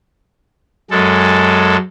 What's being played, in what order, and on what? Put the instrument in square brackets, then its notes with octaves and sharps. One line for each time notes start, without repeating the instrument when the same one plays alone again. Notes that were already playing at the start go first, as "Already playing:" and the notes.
[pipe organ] F#2 G#3 A4